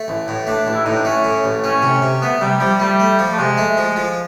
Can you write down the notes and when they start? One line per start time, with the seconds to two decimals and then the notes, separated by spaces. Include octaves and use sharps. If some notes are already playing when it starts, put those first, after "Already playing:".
Already playing: A3
0.08 A1
0.28 A2
0.47 A3 D4
0.67 A1
0.74 E4
0.85 A2 D#4
0.94 D4
1.05 A3 C#4
1.24 A2
1.44 A1
1.64 A3 C#4
1.82 C3
2.02 C3
2.21 A3 B3
2.41 C3 G3
2.60 F3 G3
2.80 G3 A3
3.00 A3
3.19 F3
3.33 A3
3.39 C3 G#3
3.58 A3
3.77 F3
3.96 F3